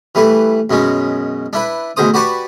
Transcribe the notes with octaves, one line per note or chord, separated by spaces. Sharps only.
E3 G3 A3 B4
F#2 B2 G#3 C#4
D4 E4 B4
D2 B2 G#3 C5 D#6
F#4 G4 B4 D5 A5 C#6